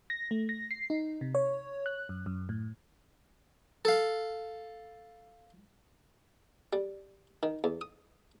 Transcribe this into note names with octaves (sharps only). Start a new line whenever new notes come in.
A#6
A3
A#6
C7
D#4
C3
C#5
F#6
F#2
F#2
A2
A4 F5
G3
D#3
E2
D#6